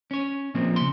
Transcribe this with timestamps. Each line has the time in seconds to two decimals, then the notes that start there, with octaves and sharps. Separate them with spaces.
0.11 C#4 C#5
0.55 A#2 F3 A#3 C4
0.76 C#3 C6